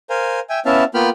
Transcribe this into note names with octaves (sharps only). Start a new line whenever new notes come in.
A#4 C5 F5 G#5
E5 G5 G#5
B3 C#4 E4 E5 F5 A5
A#3 B3 F4 G5 B5 F6